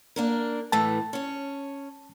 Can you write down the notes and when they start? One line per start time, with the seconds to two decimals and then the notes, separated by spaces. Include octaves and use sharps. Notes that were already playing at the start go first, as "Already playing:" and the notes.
0.16 A#3 D4 A#4
0.72 A2 E3 A3 A5
1.13 C#4 C#5